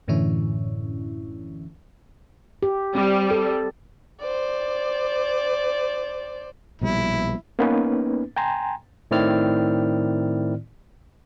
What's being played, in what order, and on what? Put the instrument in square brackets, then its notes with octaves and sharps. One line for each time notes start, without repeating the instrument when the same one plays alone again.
[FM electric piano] F#2 A2 D3 E3 C#4 E4
[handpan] G4
[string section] G3 [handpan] C4
[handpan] A4
[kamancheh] C5 D5
[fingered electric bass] A#1 B2 G3 [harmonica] E4
[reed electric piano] A#3 B3 C#4 D#4 B4
G5 G#5 A#5 C6
[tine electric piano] A2 D#3 C4 E4 D5 F6